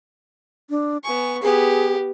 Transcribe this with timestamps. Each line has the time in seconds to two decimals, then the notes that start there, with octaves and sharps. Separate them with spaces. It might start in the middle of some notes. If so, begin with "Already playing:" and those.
0.70 D4
1.04 B3 G#5 C#6
1.43 B3 G4 G#4